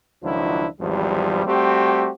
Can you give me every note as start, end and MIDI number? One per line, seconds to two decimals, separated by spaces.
0.23 0.67 37
0.23 0.67 51
0.23 0.67 53
0.23 0.67 54
0.23 0.67 62
0.23 0.67 64
0.81 1.46 32
0.81 1.46 40
0.81 1.46 53
0.81 1.46 55
1.46 2.10 55
1.46 2.10 57
1.46 2.10 60
1.46 2.10 66
1.46 2.10 67